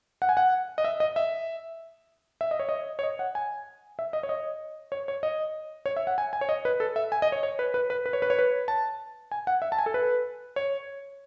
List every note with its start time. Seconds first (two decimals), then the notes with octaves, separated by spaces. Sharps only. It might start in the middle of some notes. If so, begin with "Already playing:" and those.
0.22 F#5
0.29 G#5
0.37 F#5
0.78 D#5
0.84 E5
1.00 D#5
1.16 E5
2.41 E5
2.51 D#5
2.60 C#5
2.69 D#5
2.99 C#5
3.03 D#5
3.19 F#5
3.35 G#5
3.99 E5
4.13 D#5
4.23 C#5
4.29 D#5
4.92 C#5
5.08 C#5
5.23 D#5
5.86 C#5
5.96 E5
6.07 F#5
6.18 G#5
6.33 G#5
6.41 C#5
6.49 D#5
6.65 B4
6.80 A4
6.96 E5
7.12 G#5
7.22 D#5
7.32 C#5
7.43 C#5
7.59 B4
7.74 B4
7.90 B4
8.06 B4
8.13 C#5
8.22 B4
8.30 C#5
8.39 B4
8.68 A5
9.31 G#5
9.47 F#5
9.62 E5
9.72 A5
9.79 G#5
9.86 A4
9.94 B4
10.56 C#5